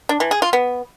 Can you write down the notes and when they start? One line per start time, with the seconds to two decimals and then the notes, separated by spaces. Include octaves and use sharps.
0.09 D4
0.20 E3
0.31 G#4
0.42 F4
0.53 B3